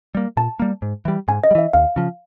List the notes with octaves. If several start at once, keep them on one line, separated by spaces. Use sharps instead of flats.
G3 A#3
A#2 A5
G3 A#3
G#2
E3 G3
G#2 G#5
D#5
G3
E3 E5
D#2 F5
C#3 F3